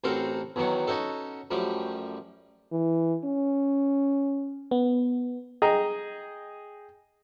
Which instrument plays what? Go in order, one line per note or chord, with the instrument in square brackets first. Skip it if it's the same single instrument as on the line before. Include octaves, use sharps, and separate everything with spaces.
[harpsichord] A1 C4 F#4 A4 A#4 F5
B1 E2 D#3 F#3 F#5
C#4 D#4 F#4 A4
F#2 F3 G3 A3
[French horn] E3
C#4
[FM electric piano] B3
[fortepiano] G#4 D#5 G5 A#5